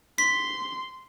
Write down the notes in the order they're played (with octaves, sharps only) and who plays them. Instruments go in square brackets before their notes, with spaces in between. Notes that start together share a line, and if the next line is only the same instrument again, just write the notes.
[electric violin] C6 [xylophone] B6